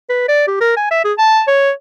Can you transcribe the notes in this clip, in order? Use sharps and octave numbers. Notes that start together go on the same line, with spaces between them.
B4
D5
G4
A#4
G#5
E5
G#4
A5
C#5